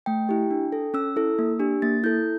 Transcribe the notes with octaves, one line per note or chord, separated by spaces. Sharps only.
A3 G5
E4 G4
D4
A4
C#4 E6
E4 A4
A#3
D4 G4
A#3 A6
E4 A4 G6